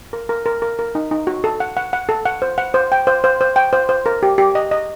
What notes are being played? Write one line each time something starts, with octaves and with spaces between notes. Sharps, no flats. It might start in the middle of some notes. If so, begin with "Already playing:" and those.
A#4
A#4
A#4
A#4
A#4
D#4
D#4
F#4
A4
F#5
F#5
F#5
A4
F#5
C5
F#5
C5
G5
C5
C5
C5
G5
C5
C5
A#4
G4
G4
D#5
D#5